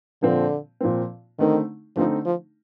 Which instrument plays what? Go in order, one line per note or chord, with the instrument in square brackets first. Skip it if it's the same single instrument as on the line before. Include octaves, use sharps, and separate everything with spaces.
[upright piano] A#2 F3 C4 [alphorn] D3
[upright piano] A#2 F3 C4
[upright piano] D3 A3 C4 D#4 [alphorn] D#3
[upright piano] D3 A3 C4 D#4 [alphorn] F3
[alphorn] F3